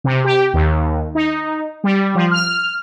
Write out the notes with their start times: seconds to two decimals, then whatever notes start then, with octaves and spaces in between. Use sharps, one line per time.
0.04 C3
0.24 G4
0.53 D#2
1.15 D#4
1.84 G3
2.15 F3
2.31 F6